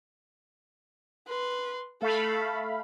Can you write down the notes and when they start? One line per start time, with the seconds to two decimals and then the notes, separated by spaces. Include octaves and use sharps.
1.28 B4 C6
2.02 A3 A4 F5 B5